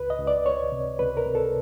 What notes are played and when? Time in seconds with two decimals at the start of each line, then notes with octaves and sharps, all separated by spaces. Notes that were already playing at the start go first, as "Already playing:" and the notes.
Already playing: C#2 B4
0.10 D#5
0.19 C#2
0.27 D5
0.46 C#2 C#5
0.72 C3
0.99 C#2 B4
1.17 A#4
1.26 C3
1.35 A4